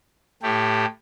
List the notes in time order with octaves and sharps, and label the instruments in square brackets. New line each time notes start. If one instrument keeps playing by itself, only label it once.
[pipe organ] A2 A3 G4